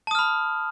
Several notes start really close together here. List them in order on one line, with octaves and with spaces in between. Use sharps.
A5 D#6 F6 B5